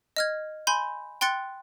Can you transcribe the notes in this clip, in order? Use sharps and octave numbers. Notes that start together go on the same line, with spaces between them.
D#5 F6 G#6
G#5 B5 C6 G6
G5 C6 F#6 A6 C#7